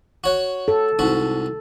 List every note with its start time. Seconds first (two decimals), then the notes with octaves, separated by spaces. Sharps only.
0.24 F#4 C#5 F#5
0.68 A4
0.99 C2 G#2 F#4